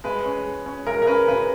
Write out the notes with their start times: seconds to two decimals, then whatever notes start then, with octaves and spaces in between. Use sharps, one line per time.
0.04 G#3 B4
0.25 C#4
0.46 G#3
0.66 C#4
0.87 G#3 A#4
1.02 A#4
1.07 C#4 B4
1.28 C#3 B4